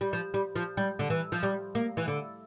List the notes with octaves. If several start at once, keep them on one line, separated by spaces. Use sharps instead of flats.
G3
F3
G3
F3
G3
D3
E3
F3
G3
A#3
E3
D3